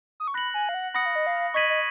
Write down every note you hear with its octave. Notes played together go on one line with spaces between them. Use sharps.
D#6
C#6
B5 F#6 A#6 C#7 F#7
G#5
F5
F#5
F#5 B5 D#6 A#6 C#7
F5
D#5
F5
D#5 C#6 G#6 B6 D#7 F#7
D#5